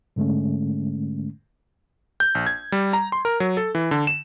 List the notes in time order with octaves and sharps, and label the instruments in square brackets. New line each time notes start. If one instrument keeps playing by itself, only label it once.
[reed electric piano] G#2 D3 G#3 A3 C#4
[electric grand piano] G6
A#1
G#6
G3
A#5
C6
A#4
F#3
A4
E3
D3
E7